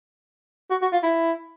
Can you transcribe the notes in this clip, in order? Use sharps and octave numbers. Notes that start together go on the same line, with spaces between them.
F#4
F#4
F4
E4